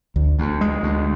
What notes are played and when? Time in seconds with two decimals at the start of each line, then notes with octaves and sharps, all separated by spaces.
0.16 D2
0.39 D2
0.61 G#3
0.83 D2